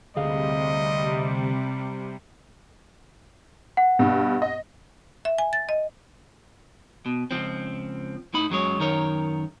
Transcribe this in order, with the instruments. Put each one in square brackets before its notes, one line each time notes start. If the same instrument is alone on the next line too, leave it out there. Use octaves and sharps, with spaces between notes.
[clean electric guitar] D2 G#4 F5 [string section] C3 G3 [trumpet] D#5
[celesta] F#5
[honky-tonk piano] G2 B2
D#5
[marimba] E5
G#5
A6
D#5
[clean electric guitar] B2
C#2 F3 C4
A2 D#4 B5
F#2 F#3 G#3 C#5
F#2 D#3 A#4 C#5